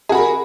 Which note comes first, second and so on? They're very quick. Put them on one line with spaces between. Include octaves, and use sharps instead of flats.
G#4 F#4 B5 A#4